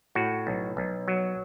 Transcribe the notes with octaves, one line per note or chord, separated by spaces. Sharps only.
A2 F#4
B1
B1
F#3